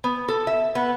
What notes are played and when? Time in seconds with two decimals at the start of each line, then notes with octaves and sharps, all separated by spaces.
0.04 B3
0.28 A4
0.47 E5
0.75 B3